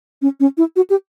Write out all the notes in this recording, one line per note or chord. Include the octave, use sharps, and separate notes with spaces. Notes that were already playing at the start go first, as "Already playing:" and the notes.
C#4
C#4
E4
F#4
G4